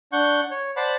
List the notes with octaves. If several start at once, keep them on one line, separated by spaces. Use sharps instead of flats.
D4 F#5 C#6 G6
C#5
C5 D5 F#5 A5 B5